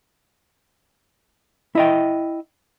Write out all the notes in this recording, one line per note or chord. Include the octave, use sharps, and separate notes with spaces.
E4 D#5 G5